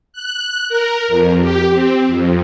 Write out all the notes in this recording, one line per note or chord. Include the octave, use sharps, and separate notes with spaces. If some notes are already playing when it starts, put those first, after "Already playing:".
F#6
A#4
F2
G4
C4
F2